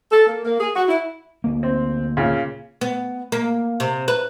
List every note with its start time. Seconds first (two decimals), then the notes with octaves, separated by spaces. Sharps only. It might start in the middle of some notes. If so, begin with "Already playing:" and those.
0.11 A4
0.26 A#3
0.45 A#3
0.60 G#4
0.74 F#4
0.88 E4
1.44 D2 A#3
1.63 C4
2.17 A#2 C#3
2.81 B3
3.32 A#3
3.80 C3
4.08 B4